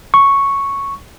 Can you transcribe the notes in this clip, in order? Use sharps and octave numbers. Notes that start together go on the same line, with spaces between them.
C#6